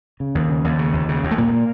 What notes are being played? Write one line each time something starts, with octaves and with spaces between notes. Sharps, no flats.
C#3
D#2
C#3
D#2
C#3
D#2
C#3
D#2
A3
A#2 A#3